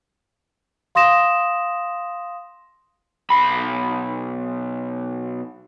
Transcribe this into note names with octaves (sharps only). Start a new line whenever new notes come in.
F5 C6 D#6 A#6 E7
B1 B5